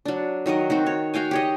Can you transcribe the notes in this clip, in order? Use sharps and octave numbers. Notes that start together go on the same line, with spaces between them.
F#3 D4
D#3 F#3 A#4 D#5
D#3 C4 F#4
C#5
F#4 F5 G5 G#5
G4 C#5 D#5